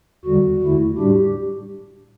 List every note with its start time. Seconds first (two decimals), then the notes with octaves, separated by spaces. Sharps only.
0.25 E2 D3 G3 F#4
0.62 E2 D3 A3 E4
0.98 A2 G3 D4 G4